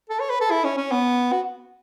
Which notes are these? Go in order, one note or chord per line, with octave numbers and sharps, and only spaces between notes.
A4
C#5
B4
A4
E4
C#4
C#4
B3
F#4